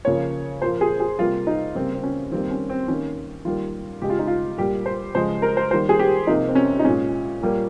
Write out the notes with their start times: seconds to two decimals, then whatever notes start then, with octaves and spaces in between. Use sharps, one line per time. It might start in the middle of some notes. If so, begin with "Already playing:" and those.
0.05 C#3 F3 A#3 C#5
0.62 A#2 F3 A#3 C5
0.81 G#4
1.00 G#4
1.19 C3 G3 A#3 F4
1.47 D#4
1.75 C#3 G3 A#3 C4
1.94 C4
2.03 C#4
2.31 D#3 G3 A#3 C4
2.51 C#4
2.70 C4
2.88 D#3 A#3 C#4
3.45 D#3 G3 A#3 F4
4.02 C#3 G#3 G4
4.10 F4
4.19 D#4
4.27 F4
4.58 A#2 G3 A#3 G4
4.86 C5
5.15 C#3 F3 G#3 C5
5.42 A#4
5.57 C5
5.71 D#3 G3 A#3 C5
5.89 G#4
5.99 G4
6.27 C3 F3 A#3 D#4
6.48 C4
6.55 C#4
6.79 D#4
6.84 A#2 G#3 C#4
7.41 A#2 G3 A#3